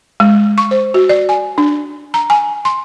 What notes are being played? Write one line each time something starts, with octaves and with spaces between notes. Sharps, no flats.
G#3
C#6
C5
F#4
D5
G#5
D4
A#5
G#5
C6